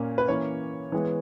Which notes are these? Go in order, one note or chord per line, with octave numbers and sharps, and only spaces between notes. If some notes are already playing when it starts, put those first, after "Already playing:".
Already playing: A#2 A#3 C#4
B4
E3 A#3 C#4 C#5
E3 G#3 B3